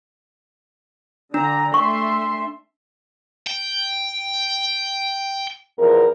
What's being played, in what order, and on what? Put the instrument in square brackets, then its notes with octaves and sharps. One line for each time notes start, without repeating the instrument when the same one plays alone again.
[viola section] D3 A#5 [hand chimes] D4
[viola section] A3 E5 C6 [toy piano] C#6
[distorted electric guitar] G5
[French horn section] E2 F3 A#4